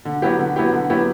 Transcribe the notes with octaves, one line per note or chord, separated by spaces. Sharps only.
D3
F#3 B3 E4 G4
D3
F#3 B3 E4 G4
D3
F#3 B3 E4 G4